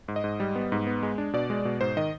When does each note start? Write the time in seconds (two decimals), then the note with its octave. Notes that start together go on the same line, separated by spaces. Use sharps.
0.08 G#2
0.16 D#5
0.24 G#2
0.40 G3
0.55 B3
0.72 G#2
0.87 B3
1.03 G#3
1.18 D4
1.33 B2 D5
1.50 G#3
1.65 B2
1.81 G#2 C5
1.97 D#3 D#5